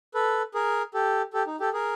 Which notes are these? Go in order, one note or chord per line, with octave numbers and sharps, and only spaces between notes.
A4 B4
G#4 A#4
G4 A4
G4 A4
D#4
G4 A4
G#4 A#4